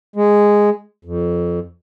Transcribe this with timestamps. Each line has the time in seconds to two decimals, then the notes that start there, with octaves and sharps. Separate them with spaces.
0.16 G#3
1.05 F2